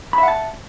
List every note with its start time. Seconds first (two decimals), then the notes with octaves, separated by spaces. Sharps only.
0.13 B5
0.18 E5
0.23 F#5
0.28 A5